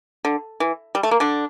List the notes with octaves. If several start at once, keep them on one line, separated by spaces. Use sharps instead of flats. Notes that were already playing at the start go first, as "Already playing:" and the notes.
D3
E3
G3
A3
A#3
D3 D4